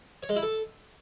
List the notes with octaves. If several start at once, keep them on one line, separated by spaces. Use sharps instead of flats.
C#5
G#3
E4
A4